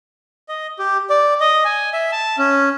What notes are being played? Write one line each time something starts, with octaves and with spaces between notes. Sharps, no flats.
D#5
G4
D5
D#5
G#5
E5
A5
C#4